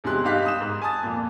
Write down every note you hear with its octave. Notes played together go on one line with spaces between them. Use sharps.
E1 C3 G#3 C6 F#6
G2 D#4 G4 F5 F#6 B6
D#6 E7
G#2
G#5 A5 D#6 A6
F2 A#2